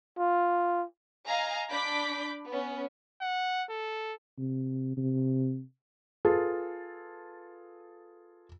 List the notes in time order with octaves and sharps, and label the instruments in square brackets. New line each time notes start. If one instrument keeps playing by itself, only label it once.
[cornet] F4
[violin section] D#5 F5 G#5 A#5
D4 B5 D6 G6 B6
B3 C#4
[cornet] F#5
A4
[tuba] C3
C3
[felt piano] F4 G#4 A4 B4